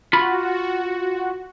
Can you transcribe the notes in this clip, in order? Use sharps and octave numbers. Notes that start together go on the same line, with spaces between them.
F4 F#4 B5